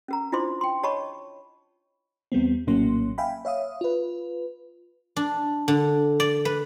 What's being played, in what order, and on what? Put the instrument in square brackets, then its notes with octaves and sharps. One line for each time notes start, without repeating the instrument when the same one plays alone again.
[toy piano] C#4 A#4 A#5
D4 E4 F4 C5 C6 D6
G5 C6
C#5 D#5 A5 B5 C#6
[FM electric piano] E2 G3 B3 C4
A#1 A2 F#3 A#3 C#4 C6
E5 F5 G5 G#5 B5
C#5 E5 F5 D#6
F4 B4
[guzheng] D4
D3
D5
B4